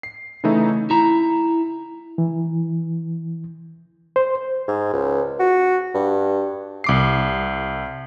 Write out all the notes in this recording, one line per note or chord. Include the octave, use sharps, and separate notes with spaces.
C7
C#3 E3 A3 D#4 E4
E4 A#5
E3
C5
G#2
C#2
F#4
G2
C2 D6 C7